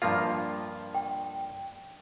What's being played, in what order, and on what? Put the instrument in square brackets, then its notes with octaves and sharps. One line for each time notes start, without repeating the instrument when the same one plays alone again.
[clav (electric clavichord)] G2 F3 A#3 F4 [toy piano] F5
[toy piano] G5